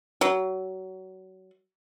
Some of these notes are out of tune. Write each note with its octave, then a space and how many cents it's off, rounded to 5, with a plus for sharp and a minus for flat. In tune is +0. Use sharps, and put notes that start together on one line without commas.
F#3 +25